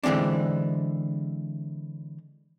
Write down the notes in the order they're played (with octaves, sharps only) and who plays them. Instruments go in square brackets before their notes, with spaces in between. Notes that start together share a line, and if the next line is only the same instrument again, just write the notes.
[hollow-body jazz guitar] D3 E3 G#3 C4 D4